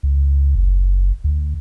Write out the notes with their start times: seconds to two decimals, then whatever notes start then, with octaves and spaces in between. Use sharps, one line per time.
0.03 C#2
0.55 F#1
1.24 D2